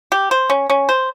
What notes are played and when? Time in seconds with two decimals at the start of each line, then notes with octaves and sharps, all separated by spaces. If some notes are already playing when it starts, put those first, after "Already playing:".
0.12 G4
0.31 C5
0.50 C#4
0.70 C#4
0.89 C5